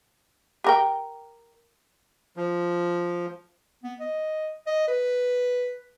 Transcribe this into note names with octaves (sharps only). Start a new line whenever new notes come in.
G4 A#4 G5
F3
B3
D#5
D#5
B4